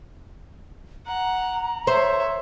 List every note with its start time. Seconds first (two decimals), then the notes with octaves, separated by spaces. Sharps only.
1.07 F#5 A#5
1.87 C5 C#5 E5